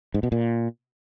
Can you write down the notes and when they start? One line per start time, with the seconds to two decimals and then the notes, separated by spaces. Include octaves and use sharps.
0.14 G#2
0.23 B2
0.32 A#2